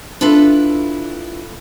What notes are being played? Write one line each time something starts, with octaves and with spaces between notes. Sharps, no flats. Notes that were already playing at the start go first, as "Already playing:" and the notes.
D4 E4 F4 A4 B4